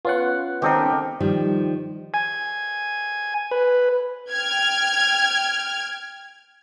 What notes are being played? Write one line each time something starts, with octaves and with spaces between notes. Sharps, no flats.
B3 C#4 F4 F#5
D#3 C4 G4 A4 A#4 D#5
D#3 F3 G3
G#5
B4
G5 F6 G#6